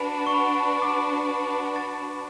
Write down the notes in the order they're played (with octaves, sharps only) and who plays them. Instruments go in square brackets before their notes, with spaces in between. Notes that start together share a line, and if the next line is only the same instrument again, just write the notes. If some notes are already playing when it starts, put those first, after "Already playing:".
Already playing: [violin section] D4 F#4 B4 [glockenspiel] B5
[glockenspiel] C#6
B5
D6
A6